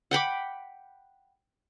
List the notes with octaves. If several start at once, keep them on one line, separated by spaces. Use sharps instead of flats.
F#5 G5 B5 D6